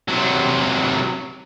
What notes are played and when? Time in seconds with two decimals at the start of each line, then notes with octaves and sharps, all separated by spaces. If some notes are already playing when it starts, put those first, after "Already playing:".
0.08 C3 F#3